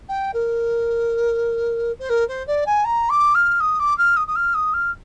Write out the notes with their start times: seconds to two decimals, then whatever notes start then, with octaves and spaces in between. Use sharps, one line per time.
0.09 G5
0.34 A#4
1.99 C5
2.09 A#4
2.28 C5
2.47 D5
2.66 G#5
2.85 A#5
3.10 D6
3.35 F6
3.60 D#6
3.80 D6
3.98 F6
4.17 D#6
4.27 D#6
4.36 F6
4.54 D#6
4.74 F6